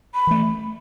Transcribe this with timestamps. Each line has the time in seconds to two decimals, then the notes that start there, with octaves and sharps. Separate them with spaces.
0.14 B5
0.27 E3 A3